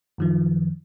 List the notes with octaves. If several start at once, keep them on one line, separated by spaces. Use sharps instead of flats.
F#2 D#3 F3